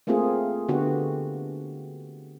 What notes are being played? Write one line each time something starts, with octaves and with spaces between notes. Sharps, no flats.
A3 A#3 C4 F4 G#4
D3 B3 F#4 G4